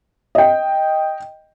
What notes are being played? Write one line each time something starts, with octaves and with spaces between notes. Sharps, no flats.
D#5 G5